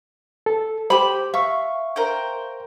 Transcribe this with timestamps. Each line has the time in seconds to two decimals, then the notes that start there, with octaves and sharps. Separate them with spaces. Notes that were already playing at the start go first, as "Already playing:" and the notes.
0.46 A4
0.90 G4 C5 B5 D6
1.34 E5 F5 C#6
1.96 A#4 C5 G5